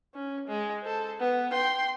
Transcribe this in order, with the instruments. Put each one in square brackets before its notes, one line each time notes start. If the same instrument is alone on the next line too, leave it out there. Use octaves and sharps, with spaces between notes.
[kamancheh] C#4
G#3
A4 C5
B3
G5 C6